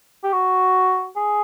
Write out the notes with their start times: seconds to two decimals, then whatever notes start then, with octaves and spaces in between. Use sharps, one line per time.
0.24 G4
0.33 F#4
1.17 G#4